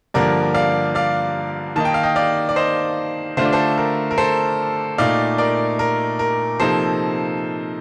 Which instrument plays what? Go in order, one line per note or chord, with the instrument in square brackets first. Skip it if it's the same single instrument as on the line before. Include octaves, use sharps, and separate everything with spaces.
[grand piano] G2 D3 F3 A#3 A#4 D5
D5 F5
D5 F5
D#3 A#3 D#4 A5
G5
F5
D#5 G5
D5 F5
D5
C5 D#5
D3 A3 D4 F4 C5
D5
A4 C5
A#4
A#4
A4 C5
A#2 A3 D#4 D5 F5
A#4 D5
A#4
A#4
C3 F3 A#3 D#4 A4 C5